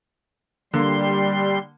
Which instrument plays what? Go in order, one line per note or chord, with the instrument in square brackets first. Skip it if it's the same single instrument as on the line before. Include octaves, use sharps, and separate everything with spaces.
[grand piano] D3 A#3 [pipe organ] G3 C6